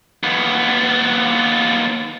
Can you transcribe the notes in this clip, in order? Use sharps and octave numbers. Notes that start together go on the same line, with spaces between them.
D#2 B3